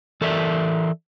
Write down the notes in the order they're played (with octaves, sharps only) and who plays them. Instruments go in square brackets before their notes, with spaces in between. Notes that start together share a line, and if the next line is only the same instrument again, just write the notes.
[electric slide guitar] E3 A4 A#4 D5 E5